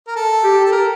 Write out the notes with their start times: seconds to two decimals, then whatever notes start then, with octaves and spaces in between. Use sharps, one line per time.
0.07 A#4
0.16 A4
0.44 G4
0.65 A4
0.72 A#4